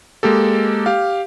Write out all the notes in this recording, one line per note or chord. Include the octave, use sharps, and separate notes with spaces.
G#3 A#3 G4 A4
G4 F5